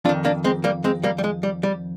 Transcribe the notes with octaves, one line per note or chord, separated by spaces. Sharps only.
F2 D#3 D4 F4
A#3 D4
G#3 C4
G3 A#3
G#3 C4
G3 A#3
G3
G#3
G3
G3